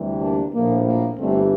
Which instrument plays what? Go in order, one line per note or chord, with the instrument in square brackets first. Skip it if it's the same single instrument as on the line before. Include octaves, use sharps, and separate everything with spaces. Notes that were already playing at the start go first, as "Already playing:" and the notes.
Already playing: [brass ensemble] D2 C3 E3 G3
A#3 D4
A#1 A2 F3 A#3
A#3
G1 G2 E3 G3 A3 C4